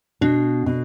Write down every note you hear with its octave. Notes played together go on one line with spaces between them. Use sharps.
B2 D4
B2